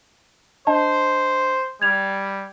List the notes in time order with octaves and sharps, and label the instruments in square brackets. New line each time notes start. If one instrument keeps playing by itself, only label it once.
[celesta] D4 D#5 A5 [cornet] C5
[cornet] G3 [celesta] G#6 F7